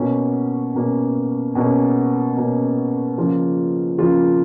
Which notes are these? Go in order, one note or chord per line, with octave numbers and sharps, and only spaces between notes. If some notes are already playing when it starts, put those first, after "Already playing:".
Already playing: B2 A#3 C#4
B2 A#3 C#4
B2 A#3 C#4
B2 A#3 C#4
C#3 F3 A#3 F4
C#3 F3 A#3 F4